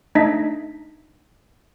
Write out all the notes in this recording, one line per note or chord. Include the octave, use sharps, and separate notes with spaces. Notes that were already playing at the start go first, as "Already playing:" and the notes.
A3 D4 D#4 D#5 E5 B6